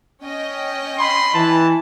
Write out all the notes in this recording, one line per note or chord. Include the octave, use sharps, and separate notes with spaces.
C#4 D#5 G5
B5 C6
E3 A5